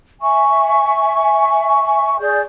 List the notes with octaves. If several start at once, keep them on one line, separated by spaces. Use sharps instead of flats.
E5 G#5 C#6
G#4 D5 G6